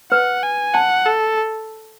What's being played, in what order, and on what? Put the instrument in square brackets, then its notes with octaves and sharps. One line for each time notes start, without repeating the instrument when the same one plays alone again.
[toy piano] B4 [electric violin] F#5
[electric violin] G#5
[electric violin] F#5 [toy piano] A5
[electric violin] A4